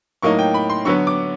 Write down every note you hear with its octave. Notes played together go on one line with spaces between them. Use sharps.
A2 F#3 A#3 D#4 C#6
G5
B5
C6
D3 F#3 B3 C#6
D6